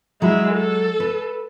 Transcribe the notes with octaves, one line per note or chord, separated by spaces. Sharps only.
F#3 G#3 E4
A4
B4